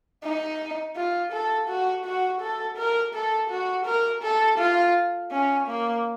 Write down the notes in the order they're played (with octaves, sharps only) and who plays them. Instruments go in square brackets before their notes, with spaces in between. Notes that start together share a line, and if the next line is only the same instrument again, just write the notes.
[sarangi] D#4
F4
A4
F#4
F#4
A4
A#4
A4
F#4
A#4
A4
F4
C#4
A#3